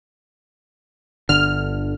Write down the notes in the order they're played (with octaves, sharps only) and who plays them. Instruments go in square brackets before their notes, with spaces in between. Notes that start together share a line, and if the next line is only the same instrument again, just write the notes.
[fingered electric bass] G1 D3 [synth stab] F6